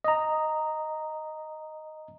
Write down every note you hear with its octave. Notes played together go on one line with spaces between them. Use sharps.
D#5 A#5